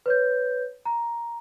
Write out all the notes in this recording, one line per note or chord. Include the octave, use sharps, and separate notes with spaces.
B4 C#5 G6
A#5